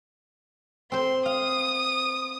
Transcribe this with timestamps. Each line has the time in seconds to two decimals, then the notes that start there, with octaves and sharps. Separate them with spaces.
0.92 C4 C5 C6
1.26 F5 D#6